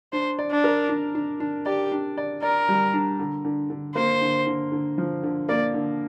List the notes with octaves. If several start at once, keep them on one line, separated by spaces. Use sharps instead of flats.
D4 C5
D5
D4
A#4
D4
D4
D4
G4 D5
D4
D5
A#4 D5
G3
D4
D3
D3
D3
A#3 C5
D3
D3
D3
F3
D3
A#3 D5
D3